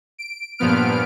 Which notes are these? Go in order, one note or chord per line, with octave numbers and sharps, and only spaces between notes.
D7
G2 A#2 F3 B3 F6 D7